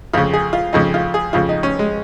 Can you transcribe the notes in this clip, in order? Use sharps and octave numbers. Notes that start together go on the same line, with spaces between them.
F2 C#3 F4
G#4
F4
F2 C#3 D#4
F4
G#4
F2 C#3 F4
D#4
C#4
G#3